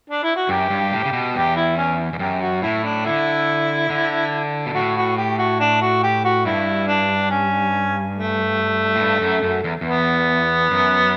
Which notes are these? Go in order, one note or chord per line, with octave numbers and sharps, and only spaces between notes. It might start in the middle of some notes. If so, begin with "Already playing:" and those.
D4
E4
F#4
F#2 G4
G2
A2
C#3
B2
E2 G4
E4
C#4
E2
F#2 G4
F#4
A2 E4
D4
D3 E4
D3
B2
A2 F#4
F#4
G4
F#4
D4
F#4
G4
F#4
G2 E4
D4
C#4
A3
A2
G2
F#2
F#2
E2
E2 B3
F#2